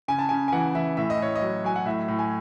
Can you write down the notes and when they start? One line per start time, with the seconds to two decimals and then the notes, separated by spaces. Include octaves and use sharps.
0.08 C#3 G#5
0.19 A5
0.29 C#3 G#5
0.48 G#5
0.52 E3 F#5
0.75 E3 E5
0.97 A2 E5
1.10 D#5
1.19 A2 C#5
1.35 D#5
1.42 F#3
1.64 F#3 G#5
1.76 F#5
1.86 A2 E5
2.08 A2
2.19 G#5